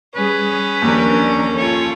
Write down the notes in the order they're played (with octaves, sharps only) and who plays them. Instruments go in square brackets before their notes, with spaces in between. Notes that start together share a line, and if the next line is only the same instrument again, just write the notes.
[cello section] G3 G#4 [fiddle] C#4 [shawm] B4
[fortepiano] D#2 [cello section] F3 D4 A#4
[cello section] F4 A4 [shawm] C#5